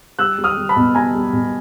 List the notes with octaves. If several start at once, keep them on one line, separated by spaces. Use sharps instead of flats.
G3 E6 F#6
G3
D#6 F6
G3
A5 B5
B2
G3 G#5 A#5
G3
B2